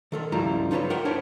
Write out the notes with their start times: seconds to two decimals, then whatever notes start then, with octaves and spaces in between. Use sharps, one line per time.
0.12 D#3 A4 A#4
0.32 C#2 G2 F3 G3 E4 A#5
0.71 D#4 F4 A4 B4 C#5
0.90 A#4 F#5 G5
1.05 D4 E4 A#4 C5 C#5